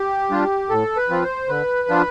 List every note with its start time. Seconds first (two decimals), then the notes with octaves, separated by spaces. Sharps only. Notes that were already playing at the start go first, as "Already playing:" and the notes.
Already playing: G4
0.30 G3 D4 F4
0.70 A2 A4
0.97 B4
1.09 F3 C4 F4
1.23 C5
1.49 D3 B4
1.89 F3 B3 D4 F4